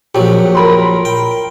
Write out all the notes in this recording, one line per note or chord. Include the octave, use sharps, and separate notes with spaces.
A#1 F#3 G4
A#4 B5 C6
G5